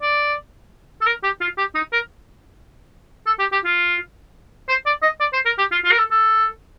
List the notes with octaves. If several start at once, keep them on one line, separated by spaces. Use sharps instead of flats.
D5
A4
A#4
G4
F4
G4
D#4
A#4
A4
G4
G4
F4
C5
D5
D#5
D5
C5
A#4
G4
F4
F4
A#4
A4
A4